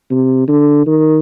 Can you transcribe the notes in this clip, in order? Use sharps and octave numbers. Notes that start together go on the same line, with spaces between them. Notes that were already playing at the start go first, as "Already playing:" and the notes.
C3
D3
D#3